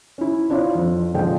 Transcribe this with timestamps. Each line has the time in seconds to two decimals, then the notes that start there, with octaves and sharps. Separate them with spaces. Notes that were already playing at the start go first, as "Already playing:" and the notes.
0.18 C#4 E4
0.49 C4 D4 E4 F4 C#5
0.75 F2
1.14 F#1 A#2 D3 F3 G#3 G5